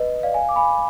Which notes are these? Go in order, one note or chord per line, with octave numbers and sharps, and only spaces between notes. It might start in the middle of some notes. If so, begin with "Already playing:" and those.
Already playing: B4 D#5
D5 F5
F5 G#5
D6
G#5 B5